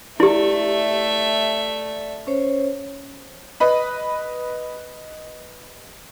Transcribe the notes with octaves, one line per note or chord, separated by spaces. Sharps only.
A3 E4 G4 D5 E5
C#4 C5 C#5
B4 D#5 B5